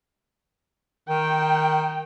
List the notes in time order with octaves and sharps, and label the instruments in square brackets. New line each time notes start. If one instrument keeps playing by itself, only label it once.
[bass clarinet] D#3 [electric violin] G5